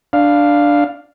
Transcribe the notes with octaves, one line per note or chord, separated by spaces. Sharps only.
D4 F5